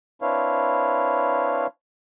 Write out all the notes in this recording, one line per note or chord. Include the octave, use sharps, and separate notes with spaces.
C4 D4 E4 B4 C#5 F5